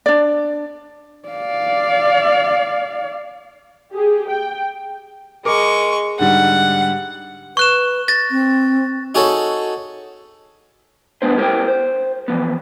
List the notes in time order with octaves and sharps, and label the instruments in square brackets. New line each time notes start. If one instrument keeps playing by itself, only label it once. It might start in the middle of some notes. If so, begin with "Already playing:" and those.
[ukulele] D4 D5
[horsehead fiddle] D5 F5
[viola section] G4 G#4
G5
[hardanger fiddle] G#3 C#6 [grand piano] A#4 D6
[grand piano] G#2 D3 G3 [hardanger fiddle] F#5
[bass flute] B4 [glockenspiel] C#6 F#6 E7
[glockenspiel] A6 A#6
[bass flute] C4
[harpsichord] D#4 F#4 G#4 A4 C#5
[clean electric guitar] G#3 B3 D4 F4 B4 C5
E4 G4 A#4 C5 F5 G5
C5
E3 F3 B3